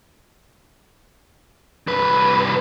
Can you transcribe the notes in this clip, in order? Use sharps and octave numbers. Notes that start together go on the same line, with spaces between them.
C2 B4